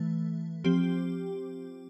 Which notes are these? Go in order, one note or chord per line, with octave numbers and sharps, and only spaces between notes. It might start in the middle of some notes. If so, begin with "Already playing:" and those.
Already playing: E3 A3
F3 C4 G4